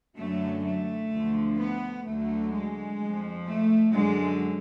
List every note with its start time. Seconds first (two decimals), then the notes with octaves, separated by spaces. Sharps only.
0.16 F#2 D3 F#3 A3
0.64 A3
1.10 D2 D3 F3
1.58 B3
2.05 D2 D3 F#3 A3
2.52 G#3
2.99 F2 F3
3.46 A3
3.93 F#2 D3 F#3 G#3